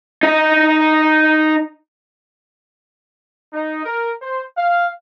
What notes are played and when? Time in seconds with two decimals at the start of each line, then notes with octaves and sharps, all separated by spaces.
0.23 D#4 D#5
3.53 D#4
3.85 A#4
4.21 C5
4.57 F5